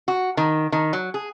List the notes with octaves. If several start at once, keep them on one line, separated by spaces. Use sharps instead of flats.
F#4
D#3
D#3
F#3
G#4